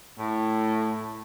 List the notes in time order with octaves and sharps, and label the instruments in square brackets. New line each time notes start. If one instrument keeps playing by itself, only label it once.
[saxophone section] A2